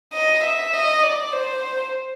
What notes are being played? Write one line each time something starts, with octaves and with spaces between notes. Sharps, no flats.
D#5
E5
D#5
D5
C5